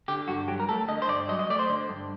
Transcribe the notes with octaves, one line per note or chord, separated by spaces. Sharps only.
D3 G4
G2 F#4
F#3 G4
A#4
A3 A4
D3 D#5
C5
G2 D5
F#3 D#5
D#5
A3 D5
C5
D3
G2